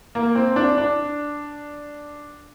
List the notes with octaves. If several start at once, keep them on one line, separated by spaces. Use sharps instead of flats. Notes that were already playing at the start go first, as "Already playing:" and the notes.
A#3
C4
D4
D4